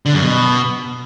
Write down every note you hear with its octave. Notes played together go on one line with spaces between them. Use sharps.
D3
F#2
B2